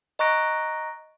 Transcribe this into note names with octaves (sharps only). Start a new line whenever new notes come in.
D#5 A#5 C#6 F#6 A#6 D7